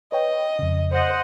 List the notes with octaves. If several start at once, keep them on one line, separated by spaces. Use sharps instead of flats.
B4 C#5 D#5 G5
F2 C#3
C5 D#5 F#5